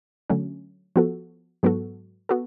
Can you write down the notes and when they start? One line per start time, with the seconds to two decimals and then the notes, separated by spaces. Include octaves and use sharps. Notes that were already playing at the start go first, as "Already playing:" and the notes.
0.30 D3 F#3 A3 C#4
0.96 F3 B3 F#4 A4
1.63 G#2 F#3 B3 F#4 A4
2.29 B3 F#4 A4